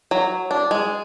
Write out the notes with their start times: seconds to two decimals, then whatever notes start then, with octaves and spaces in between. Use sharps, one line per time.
0.11 F#3
0.51 D4
0.71 G#3